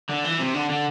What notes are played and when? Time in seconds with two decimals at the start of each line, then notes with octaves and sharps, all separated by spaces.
0.10 D3
0.24 E3
0.40 C3
0.54 D3
0.70 D3